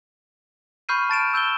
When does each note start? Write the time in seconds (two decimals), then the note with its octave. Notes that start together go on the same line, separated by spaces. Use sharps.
0.89 B5 C#6 F6 G6 C7 D#7
1.09 A5 A6 D7 E7
1.34 E6 G6 E7 G7